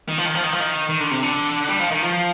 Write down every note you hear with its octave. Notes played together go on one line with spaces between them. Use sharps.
D#3
F3
D#3
F3
D#3
F3
D#3
D#3
D3
C3
D3
G3
F3
D#3
F3